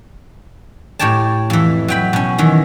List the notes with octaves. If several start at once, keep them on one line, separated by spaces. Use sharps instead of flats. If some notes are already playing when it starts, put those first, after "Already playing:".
A2 G4 C#5 G5 A5
F2 E3
F#3 G5 B5
B2 C#4
D#3 E3